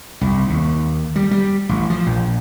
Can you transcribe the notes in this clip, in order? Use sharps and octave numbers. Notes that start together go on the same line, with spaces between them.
C2
D#2
G3
G3
A1
F3
A#1